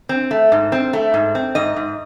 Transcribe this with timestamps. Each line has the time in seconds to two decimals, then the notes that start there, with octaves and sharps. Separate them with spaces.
0.09 C4
0.31 A3
0.52 G#2
0.72 C4
0.93 A3
1.14 G#2
1.35 C4
1.55 G#2 D#5
1.76 G#2